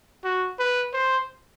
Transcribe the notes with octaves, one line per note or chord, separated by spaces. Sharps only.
F#4
B4
C5